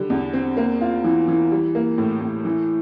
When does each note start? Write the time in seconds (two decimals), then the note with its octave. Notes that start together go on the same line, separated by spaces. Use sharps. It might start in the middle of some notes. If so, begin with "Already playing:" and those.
Already playing: D3 G3
0.10 E2
0.34 C4
0.57 A#3
0.81 F4
1.04 E3
1.28 E3
1.51 G3
1.75 A#3
1.98 A2
2.21 A2
2.45 E3